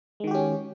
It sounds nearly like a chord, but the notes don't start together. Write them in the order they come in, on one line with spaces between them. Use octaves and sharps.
G#3 D#3 F#4 G4 C#4